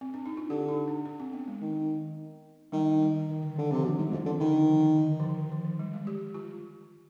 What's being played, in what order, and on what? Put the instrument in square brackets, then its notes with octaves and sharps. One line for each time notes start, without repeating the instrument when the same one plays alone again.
[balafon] C4
D4
D#4
F4
[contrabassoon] D3 [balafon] G4
[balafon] D#4
D4
D4
C4
B3
G#3
[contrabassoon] D#3
[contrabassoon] D#3 [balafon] G3
[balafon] G3
D#3
D3
[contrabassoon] D3 [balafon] D#3
[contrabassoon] C3 [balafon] F3
[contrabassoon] B2 [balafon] F3
[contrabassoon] G#2 [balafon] G3
[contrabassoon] F2 [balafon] F3
[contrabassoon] D3 [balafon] D#3
[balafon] D3 [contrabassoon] D#3
[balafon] F3
D3
F3
D#3
F3
F3
G3
G#3
G4
F4